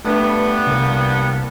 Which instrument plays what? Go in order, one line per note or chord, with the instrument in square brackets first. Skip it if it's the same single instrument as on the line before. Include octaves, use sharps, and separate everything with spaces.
[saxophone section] G2 B3 [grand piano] A3 D4 B4
[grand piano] C2 A#3